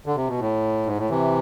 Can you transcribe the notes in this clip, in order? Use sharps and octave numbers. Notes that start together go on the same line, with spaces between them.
D3
C3
B2
A2
G#2
A2
C3 E3